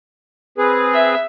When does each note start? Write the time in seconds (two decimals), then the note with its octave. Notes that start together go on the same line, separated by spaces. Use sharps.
0.58 C4 G#4 B4
0.93 E5